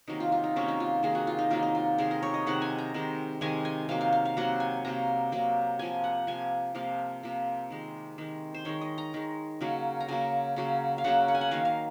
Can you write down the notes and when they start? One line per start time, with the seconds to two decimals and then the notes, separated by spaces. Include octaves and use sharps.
0.08 C3 D#3 F#3 A#3 D#4
0.20 F4
0.32 F4
0.44 D#4
0.56 C3 D#3 F#3 A#3 C#4
0.68 D#4
0.80 F4
1.03 C3 D#3 F#3 A#3 G#4
1.15 F#4
1.27 F4
1.39 D#4
1.50 C3 D#3 F#3 A#3 F4
1.63 D#4
1.75 F4
1.98 C3 D#3 G#3 G#4
2.11 A#4
2.23 C#5
2.34 D#5
2.46 C3 D#3 G#3 F#5
2.62 G#5
2.78 A#5
2.94 C3 D#3 G#3
3.41 C3 D#3 G#3 G#5
3.65 G#5
3.89 C3 F#3 A#3 F5
4.01 F5
4.12 F5
4.25 F5
4.37 C3 F#3 A#3 F#5
4.60 G#5
4.85 C3 F#3 A#3 A#5
5.32 C3 F#3 A#3
5.79 C3 F3 A#3 G#5
6.04 F#5
6.27 C3 F3 A#3 G#5
6.74 C3 F3 A#3 F5
7.23 C3 F3 A#3
7.70 D#3 G#3
8.18 D#3 G#3
8.54 C5
8.65 D#3 G#3 C#5
8.81 D#5
8.98 A#5
9.14 D#3 G#3
9.61 C#3 F#3 A#3
10.00 A#5
10.08 C#3 F#3 A#3 G#5
10.56 C#3 F#3 A#3
10.98 F5
11.04 C#3 F#3 A#3 F#5
11.28 F#5
11.35 G#5
11.41 F#5
11.51 D#3 F#3 A#3 F5
11.65 F5